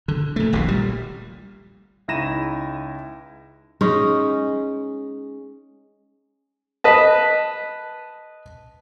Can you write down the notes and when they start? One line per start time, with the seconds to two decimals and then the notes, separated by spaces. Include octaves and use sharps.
0.08 D3
0.36 A#2 A3
0.53 D#1 A#1 D#2 A#2
0.68 A#2 G3
2.08 C#2 D#4 E4 A#6 D#7 E7
3.81 G#3 C#4 D#4
6.84 B4 D#5 A5